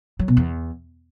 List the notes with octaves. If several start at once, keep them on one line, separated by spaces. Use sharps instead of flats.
F#3
B2
E2